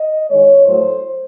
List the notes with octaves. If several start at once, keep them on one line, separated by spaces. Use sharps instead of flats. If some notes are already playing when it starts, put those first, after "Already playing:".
Already playing: D#5
D#3 G#3 C#5
A2 F#3 A3 C5